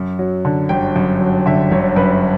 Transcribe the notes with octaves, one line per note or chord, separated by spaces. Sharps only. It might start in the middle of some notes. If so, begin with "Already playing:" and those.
Already playing: F#2
F#3
D3
G1 G5
F#2
F#3
D3 E5
G1 C#5
F#2 B4